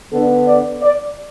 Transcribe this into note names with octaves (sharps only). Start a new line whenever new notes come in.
D3 B3 D4 A4
D5
D5